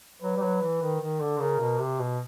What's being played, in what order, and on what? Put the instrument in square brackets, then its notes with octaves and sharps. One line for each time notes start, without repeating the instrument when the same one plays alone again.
[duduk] F#3 [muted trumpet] B4
[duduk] G3
F#3
E3
D#3
D#3
D3
[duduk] C#3 [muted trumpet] A#4
[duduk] B2
C3
B2